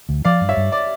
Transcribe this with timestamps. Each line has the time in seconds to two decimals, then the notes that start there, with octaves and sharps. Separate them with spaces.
0.09 D2
0.25 F3 D5 F5
0.41 G2
0.49 C#5 E5
0.57 G2
0.72 D5